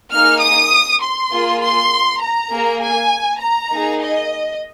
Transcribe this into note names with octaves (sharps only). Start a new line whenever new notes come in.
A#3 D#4 G#4 F6
D#6
C6
A#3 F4 G#4
C6
A#5
A#3 G#4
G#5
A#5
A#3 D#4 G#4
D#5